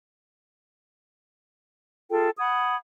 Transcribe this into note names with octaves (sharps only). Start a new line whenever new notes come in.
F4 G#4 A4 G5
F#5 B5 D#6 G#6